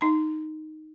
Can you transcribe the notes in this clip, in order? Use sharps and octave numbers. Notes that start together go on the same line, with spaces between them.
D#4 A#5